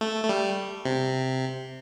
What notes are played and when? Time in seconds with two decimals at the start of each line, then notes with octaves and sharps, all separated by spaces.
0.01 A3
0.24 A3
0.29 G3
0.85 C3